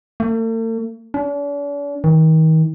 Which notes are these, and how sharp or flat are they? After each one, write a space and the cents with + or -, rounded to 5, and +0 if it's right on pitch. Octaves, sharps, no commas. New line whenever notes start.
A3 +45
D4 -45
D#3 +35